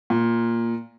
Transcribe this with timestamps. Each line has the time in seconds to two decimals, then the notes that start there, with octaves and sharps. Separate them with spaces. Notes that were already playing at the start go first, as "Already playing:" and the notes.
0.10 A#2